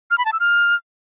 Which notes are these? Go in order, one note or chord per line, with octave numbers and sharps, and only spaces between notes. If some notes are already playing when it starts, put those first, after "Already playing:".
F6
B5
A5
E6
F6